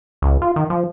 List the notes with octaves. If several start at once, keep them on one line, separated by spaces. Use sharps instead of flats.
C#2
F4
D#3
F3